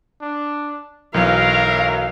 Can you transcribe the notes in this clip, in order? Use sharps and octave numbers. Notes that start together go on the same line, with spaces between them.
D4
B1 E3 F#3 A#4 F5